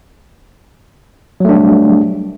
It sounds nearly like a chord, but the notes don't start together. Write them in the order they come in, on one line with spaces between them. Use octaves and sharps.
F#3 A3 D4 G3